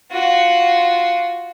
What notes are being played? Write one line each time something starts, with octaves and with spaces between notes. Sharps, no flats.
F4 F#4